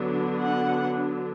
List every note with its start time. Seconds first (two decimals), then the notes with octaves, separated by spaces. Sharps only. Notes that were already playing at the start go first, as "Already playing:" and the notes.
Already playing: D3 F#3 B3 D4
0.41 F#5